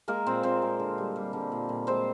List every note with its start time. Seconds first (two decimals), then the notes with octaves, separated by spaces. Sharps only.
0.08 G#3 A#3 A#4
0.26 A#2 C4 C5
0.43 A#2 C4 C5
0.62 G#3
0.80 D3
0.98 G3
1.16 G3
1.33 D3
1.52 A#2
1.69 A#2
1.87 G#3 C4 C5